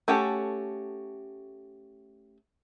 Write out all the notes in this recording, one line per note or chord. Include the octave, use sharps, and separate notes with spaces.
A3 C#4 F#4 G4 A4